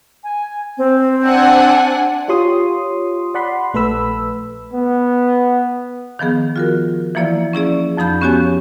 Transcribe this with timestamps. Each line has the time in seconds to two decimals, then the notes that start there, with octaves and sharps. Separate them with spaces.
0.24 G#5
0.78 C4
1.26 D4 F#5 G#5
2.28 F4 G4 C#5 C6 D#6
3.34 D5 F#5 B5 C6
3.74 A#1 A3 A4 B4 B5 E6
4.73 B3
6.19 D#3 F3 B3 G#4
6.56 F4 F#4 A#4
7.15 E3 F3 A#3 E4 D5
7.53 C#4 E4 G#4 D5
7.97 F2 F3 D#4 B5 G6
8.21 B3 C#4 F#4 G4 C#5 G#5